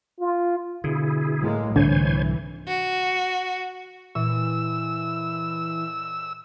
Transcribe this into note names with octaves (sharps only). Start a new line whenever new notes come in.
F4
B2 D3 E4 G#4
A2 G#3 A#3
C2 G#2 D3 E3 C5 C#5 G#5
F#4
A#2 E3 E6